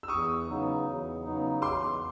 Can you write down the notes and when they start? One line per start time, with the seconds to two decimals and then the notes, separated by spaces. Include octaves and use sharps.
0.03 E6
0.08 E2 C#6 D#6
0.48 C#3 F#3 B3 D#4
0.86 E2
1.25 C#3 F#3 B3 D#4
1.62 E2 C6 D6